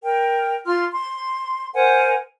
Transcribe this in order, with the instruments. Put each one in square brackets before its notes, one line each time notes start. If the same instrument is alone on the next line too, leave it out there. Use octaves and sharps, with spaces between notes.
[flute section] A#4 G5
F4 C6 F6
C6
A#4 C5 F#5 G#5